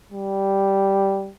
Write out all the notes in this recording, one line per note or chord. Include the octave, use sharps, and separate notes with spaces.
G3